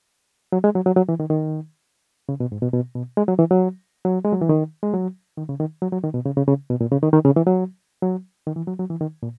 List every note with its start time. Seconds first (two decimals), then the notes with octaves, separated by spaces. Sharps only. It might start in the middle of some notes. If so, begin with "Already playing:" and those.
0.52 F#3
0.64 G#3
0.75 F#3
0.86 F#3
0.96 F#3
1.09 E3
1.20 D#3
1.30 D#3
2.29 C#3
2.40 B2
2.52 G#2
2.63 B2
2.73 B2
2.95 B2
3.17 G#3
3.28 F#3
3.39 E3
3.51 F#3
4.05 F#3
4.25 G#3
4.33 F#3
4.41 E3
4.49 D#3
4.83 G#3
4.93 F#3
5.37 D#3
5.49 C#3
5.60 D#3
5.82 F#3
5.92 F#3
6.04 D#3
6.14 B2
6.25 C#3
6.37 C#3
6.48 C#3
6.70 B2
6.81 A#2
6.92 C#3
7.03 D#3
7.13 D#3
7.25 C#3
7.36 E3
7.47 F#3
8.02 F#3
8.47 D#3
8.56 E3
8.68 F#3
8.79 F#3
8.90 E3
9.01 D#3
9.23 A#2